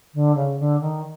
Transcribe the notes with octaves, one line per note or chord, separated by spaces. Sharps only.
D3
C#3
D3
D#3